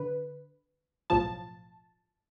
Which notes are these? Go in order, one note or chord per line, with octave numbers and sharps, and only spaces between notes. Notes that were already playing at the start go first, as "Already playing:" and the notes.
Already playing: D3 B4
B1 A2 F3 A5